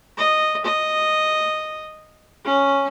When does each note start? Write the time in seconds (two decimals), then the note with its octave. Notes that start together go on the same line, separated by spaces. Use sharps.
0.17 D#5
0.65 D#5
2.45 C#4